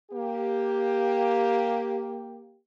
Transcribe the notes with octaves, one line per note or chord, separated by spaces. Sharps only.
A#3 G4